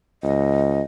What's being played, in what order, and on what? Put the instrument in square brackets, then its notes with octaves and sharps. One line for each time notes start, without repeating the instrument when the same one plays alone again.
[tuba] C#2 [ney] D#5